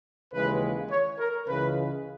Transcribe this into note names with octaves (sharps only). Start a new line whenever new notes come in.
D#2 C#3 E3 G#3 B4
C#5
A#4
C#2 C#3 E3 G#3 B4